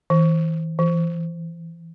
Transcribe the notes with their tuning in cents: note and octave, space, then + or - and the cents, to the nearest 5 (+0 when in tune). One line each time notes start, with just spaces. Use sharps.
E3 -35
E3 +15